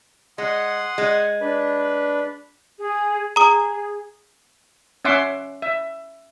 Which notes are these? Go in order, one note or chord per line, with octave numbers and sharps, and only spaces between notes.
G#3 F#5 C6 D#6
G#3
D4 B4
G#4
G#4 A#5 D#6
C#4 E5 F#5 C6 D6
E5